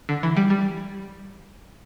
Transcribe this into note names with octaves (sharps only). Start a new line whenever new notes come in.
D3
E3
G3
G3